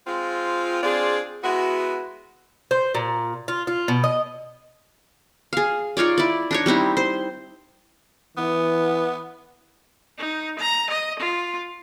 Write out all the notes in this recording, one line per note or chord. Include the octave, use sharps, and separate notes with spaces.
G#3 C4 F4
C4 D4 F4 G#4 D5
G#3 B3 E4 F#4
C5
A#2
F4
F4
B2
D#5
G#4 F5
D#4 F4 C#5 D5
E4 D5
D4 D#4 C#5
G3 C4 D#4 E4
C5
E3 B3
D#4
A#5
D#5
F4